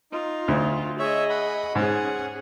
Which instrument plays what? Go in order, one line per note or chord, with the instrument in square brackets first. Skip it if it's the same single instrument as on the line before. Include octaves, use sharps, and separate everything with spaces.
[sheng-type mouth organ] D#4 [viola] F4
[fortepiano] D2
[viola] G#4 D#5 [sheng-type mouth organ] C#5 E5
[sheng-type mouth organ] F#5 B5
[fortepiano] G#2 [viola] C#4 G#4 [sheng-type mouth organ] F#5